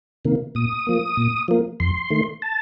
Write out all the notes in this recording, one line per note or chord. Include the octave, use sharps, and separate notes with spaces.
C3 D#3 A#3
A#2 D#6
F3 A#3
A#2
F3 A#3
F2 C6
D#3 A3
A5